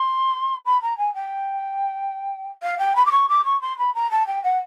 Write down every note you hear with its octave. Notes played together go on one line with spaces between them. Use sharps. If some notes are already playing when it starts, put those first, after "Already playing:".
Already playing: C6
B5
A#5
G#5
G5
F5
G5
B5
D6
C#6
D6
C#6
C6
B5
A#5
A5
G5
F#5